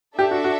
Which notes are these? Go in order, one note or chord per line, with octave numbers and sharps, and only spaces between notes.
D4 G4 A4 E5
F#4
F#4